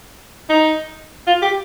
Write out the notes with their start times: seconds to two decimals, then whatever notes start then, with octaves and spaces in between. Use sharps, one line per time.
0.49 D#4
1.27 F4
1.42 G4